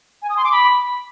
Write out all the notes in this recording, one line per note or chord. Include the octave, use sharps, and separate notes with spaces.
G#5
D#6
C6
D6
B5